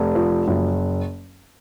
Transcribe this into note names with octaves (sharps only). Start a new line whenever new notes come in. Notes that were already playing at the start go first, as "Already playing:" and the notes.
Already playing: F1
F3
F#1